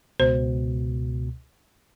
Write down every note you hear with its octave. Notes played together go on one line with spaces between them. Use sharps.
C#2 B2 C5